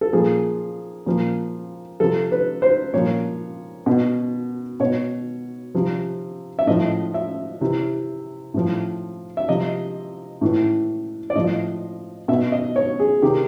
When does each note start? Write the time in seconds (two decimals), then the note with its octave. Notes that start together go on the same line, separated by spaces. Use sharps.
0.01 A4
0.13 A#2 F3 G#4
1.06 A#2 F3
2.00 C3 F3 A4
2.32 B4
2.62 C5
2.94 A#2 F3 C#5
3.86 B2
4.80 B2 C#5
5.75 C3 F3
6.59 E5
6.67 A2 F3 D#5
7.14 E5
7.61 C3 E3
8.54 A2 F3
9.37 E5
9.48 C3 F3 D#5
10.41 A2 E3
11.30 D5
11.35 A2 F3 D#5
12.28 B2 E5
12.52 D#5
12.76 C#5
13.00 G#4
13.22 C3 D#3 G4